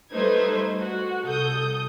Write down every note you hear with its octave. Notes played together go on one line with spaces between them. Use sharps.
G3 A3 D#4 B4 C5 G#6
F#4
C2 A4 D#6 G6